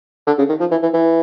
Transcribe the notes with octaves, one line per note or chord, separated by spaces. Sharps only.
D3
C#3
D#3
F3
E3
E3
E3